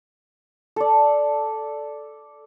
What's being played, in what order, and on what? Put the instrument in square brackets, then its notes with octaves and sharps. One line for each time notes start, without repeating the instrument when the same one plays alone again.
[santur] A4 D5